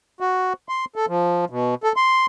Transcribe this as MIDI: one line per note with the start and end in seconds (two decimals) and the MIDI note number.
0.20 0.53 66
0.69 0.85 84
0.96 1.06 69
1.08 1.45 53
1.50 1.75 47
1.83 1.92 69
1.96 2.26 84